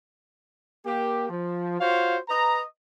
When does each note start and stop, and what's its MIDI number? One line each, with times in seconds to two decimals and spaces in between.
0.86 1.27 58
0.86 1.27 67
1.29 1.78 53
1.81 2.17 65
1.81 2.17 66
1.81 2.17 72
1.81 2.17 73
1.81 2.17 77
2.29 2.62 71
2.29 2.62 75
2.29 2.62 82